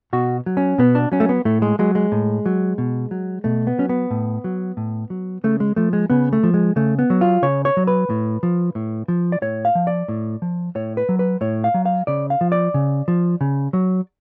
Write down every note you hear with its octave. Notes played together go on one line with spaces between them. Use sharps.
B2 F#4
F#3
C#4
B2 B3
D4
F#3 C#4
A3
B3
A2 A3
G#3
F#3 G#3
G#3
A2
F#3
B2
F#3
B2 A3
B3
F#3 C#4
B3
A2
F#3
A2
F#3
C#3 A3
G#3
F3 A3
G#3
C#3 B3
A3
F3
G#3
C#3 A3
B3
F#3
F4
C#3 C#5
C#5
F#3
B4
A2
F3
A2
F3
D5
A2 C#5
F5
F3
D5
A2
F3
A2 C#5
B4
F#3
B4
A2 C#5
F5
F#3
F5
C#3 D5
F5
F3
D5
C#3
F3
C#3
F#3